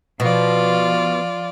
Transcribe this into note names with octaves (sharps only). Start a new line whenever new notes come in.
B2 F3 F4 D5